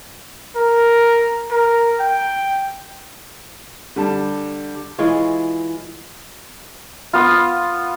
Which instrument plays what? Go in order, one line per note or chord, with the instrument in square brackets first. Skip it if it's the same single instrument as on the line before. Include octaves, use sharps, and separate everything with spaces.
[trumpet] A#4
A#4
G5
[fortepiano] D3 G3 A5
[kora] E3 G#3 F4 C#5
[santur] B3 F4